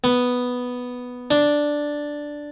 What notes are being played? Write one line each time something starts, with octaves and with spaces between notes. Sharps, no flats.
B3
D4